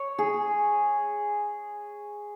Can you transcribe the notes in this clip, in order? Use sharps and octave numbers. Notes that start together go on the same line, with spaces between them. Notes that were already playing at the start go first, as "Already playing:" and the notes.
Already playing: C#5
G#4